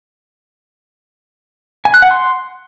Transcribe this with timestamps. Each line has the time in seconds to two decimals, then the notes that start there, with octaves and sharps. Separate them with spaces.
1.85 G#5
1.94 F#6
2.02 F#5
2.11 C6